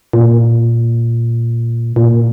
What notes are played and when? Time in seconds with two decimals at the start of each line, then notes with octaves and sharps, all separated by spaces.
0.13 A#2
1.96 A#2